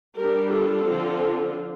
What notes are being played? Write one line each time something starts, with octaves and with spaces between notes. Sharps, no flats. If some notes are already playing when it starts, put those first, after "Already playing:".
G3 D4 G4 A#4
F4 A4
D3 F3 C4